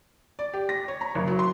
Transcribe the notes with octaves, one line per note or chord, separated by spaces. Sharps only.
D5
G4
A#6
C#5
A#5
F#1
F#3
C6